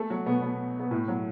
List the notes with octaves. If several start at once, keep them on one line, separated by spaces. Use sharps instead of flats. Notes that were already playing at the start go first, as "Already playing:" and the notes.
Already playing: A3 A4
F#3 F#4
B2 B3
B2 B3
B3
A2 A3
F#3